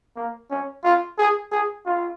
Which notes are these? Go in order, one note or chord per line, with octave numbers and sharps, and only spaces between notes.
A#3
C#4
F4
G#4
G#4
F4